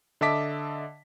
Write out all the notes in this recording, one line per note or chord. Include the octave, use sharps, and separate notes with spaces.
D3 D#5 E5 A5 D6 B6